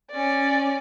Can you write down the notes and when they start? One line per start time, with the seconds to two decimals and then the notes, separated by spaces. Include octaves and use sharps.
0.11 C#4 D5